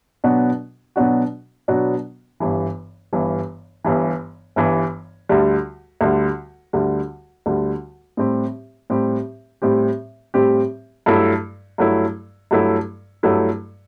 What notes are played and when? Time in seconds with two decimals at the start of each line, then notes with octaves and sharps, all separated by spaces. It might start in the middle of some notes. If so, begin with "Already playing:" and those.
0.24 B2 F#3 B3 D4 F#4
0.96 B2 F#3 B3 D4 F#4
1.68 B2 F#3 B3 D4 F#4
2.40 G1 G2 E3
3.13 G1 G2 E3
3.84 G1 G2 E3
4.56 G1 G2 E3
5.29 D2 D3 G3
6.01 D2 D3 G3
6.73 D2 D3 G3
7.46 D2 D3 G3
8.17 A2 G3 C4 G4
8.90 A2 G3 C4 G4
9.62 A2 G3 C4 G4
10.34 A2 G3 C4 G4
11.06 G2 F#3 A3 E4
11.78 G2 F#3 A3 E4
12.51 G2 F#3 A3 E4
13.23 G2 F#3 A3 E4